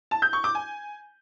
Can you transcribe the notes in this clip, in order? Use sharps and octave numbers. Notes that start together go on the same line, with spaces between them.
A5
G6
C#6
D6
G#5